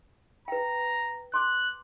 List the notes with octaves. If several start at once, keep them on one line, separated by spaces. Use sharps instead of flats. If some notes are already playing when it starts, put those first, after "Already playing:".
B4 G5 A#5
C6 D6 F#6